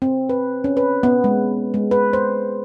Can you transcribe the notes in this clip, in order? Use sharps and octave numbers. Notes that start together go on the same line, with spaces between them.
C4
B4
C#4
B4
B3
G#3
G#3
B4
C5